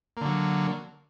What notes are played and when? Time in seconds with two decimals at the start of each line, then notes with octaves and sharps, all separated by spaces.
0.17 A#3
0.21 D3
0.26 F#3